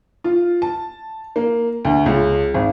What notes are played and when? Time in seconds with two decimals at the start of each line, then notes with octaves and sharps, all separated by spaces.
0.24 F4
0.62 A5
1.36 A#3
1.85 D2
2.06 C#2
2.54 G#1